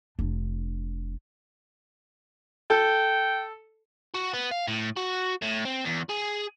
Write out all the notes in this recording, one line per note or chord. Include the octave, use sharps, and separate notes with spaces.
F1 D4
A4 G5
F#4
B3
F5
A2
F#4
A2
C4
E2
G#4